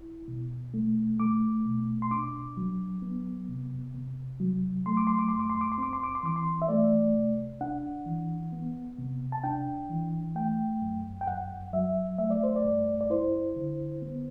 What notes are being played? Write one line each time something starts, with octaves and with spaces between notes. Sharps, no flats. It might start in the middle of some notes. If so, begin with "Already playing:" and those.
Already playing: E4
B2
A3
A3 D6
B2
C6
D4 D6
F#3
B3
C3
C3
F#3
A3 C6
D6
C6
D6
G2 C6
D6
C6
D6
C6
C4 D6
C6
D6
C6
E3 D6
C6
E5
A3 D5
C3
D4 F#5
E3
B3
C3
A5
D4 G5
E3
A3 G5
F#2
G5
F#2 F#5
F#3 E5
A3 E5
D5
C5
D5
G2
D5
E4 C5
D3
B3